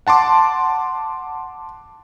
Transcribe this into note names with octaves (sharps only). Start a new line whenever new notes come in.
F#5 A5 C6 D6